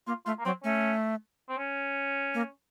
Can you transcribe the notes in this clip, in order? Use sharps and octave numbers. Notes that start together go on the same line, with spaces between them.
A#3 F4
A3 F4
A#3
F#3 C4
A3 C#4
C4
C#4
A#3